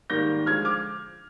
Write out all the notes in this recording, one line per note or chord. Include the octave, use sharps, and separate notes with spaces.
G#2 D#3 G3 A#3 G6 A#6
D3 F3 G#3 F6 G#6
D6 F6